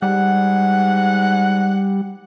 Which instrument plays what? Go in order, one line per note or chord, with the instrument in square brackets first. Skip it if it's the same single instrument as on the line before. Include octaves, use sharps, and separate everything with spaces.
[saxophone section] G#2 F#5 [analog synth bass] G3